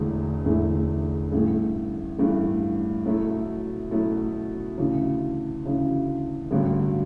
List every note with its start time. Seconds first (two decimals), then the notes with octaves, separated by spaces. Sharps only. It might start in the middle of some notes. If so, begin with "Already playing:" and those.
Already playing: E1 E2 D3 A3 E4
0.45 E1 E2 D3 A3 E4
1.32 A1 G2 E3 A3
2.18 A1 G2 E3 A3
3.05 B2 F#3 A3 E4
3.91 B2 F#3 A3 E4
4.78 D2 C#3 E3
5.65 D2 C#3 E3
6.51 A1 G2 D3 F#3